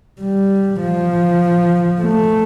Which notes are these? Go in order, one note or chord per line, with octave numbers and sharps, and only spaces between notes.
G3
F3
A3